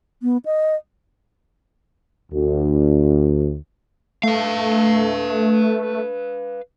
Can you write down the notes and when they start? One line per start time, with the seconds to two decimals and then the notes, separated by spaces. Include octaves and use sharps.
0.23 B3
0.46 D#5
2.32 D2
4.23 A3 B4 F5